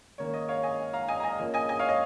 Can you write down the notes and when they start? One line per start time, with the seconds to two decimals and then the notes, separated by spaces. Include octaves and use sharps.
0.18 D#3 A#3 C#4 C#5
0.34 D#5
0.49 C#5 F5
0.63 D#5 G#5
0.93 F5 A#5
1.09 D#5 G#5
1.20 A#5
1.23 D#5 G#5
1.39 F3 A#3 C#4
1.54 D#5 G#5
1.69 D#5 G#5
1.79 C#5 F5
1.89 D#5